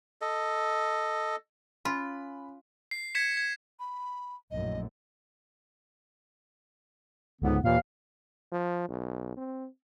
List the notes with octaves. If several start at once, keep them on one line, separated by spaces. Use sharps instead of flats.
A4 D#5
C#4 F4 B5
C7
G#6 B6 C#7 E7
G#6
B5
A#1 F#2 A2 D#5
C#2 G#2 D3 B3
D#2 A#2 E3 F5
F3
B1
C4